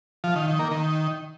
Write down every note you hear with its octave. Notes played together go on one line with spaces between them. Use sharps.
F3
D#3
D#3
A#3
D#3